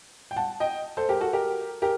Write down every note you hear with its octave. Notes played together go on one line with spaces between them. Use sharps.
G5
F#5 A5
D#5 G5
A4 C5
G4 A#4
F#4 A4
G4 A#4
G4 A#4